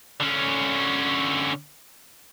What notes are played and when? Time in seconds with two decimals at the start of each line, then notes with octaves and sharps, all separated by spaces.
0.20 D3 C#4